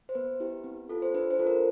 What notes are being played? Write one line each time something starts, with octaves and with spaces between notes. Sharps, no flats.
C5
B3 B4
E4 G4
C4
F4 A4
C5
D4 B4
C5
F4 A4
A#4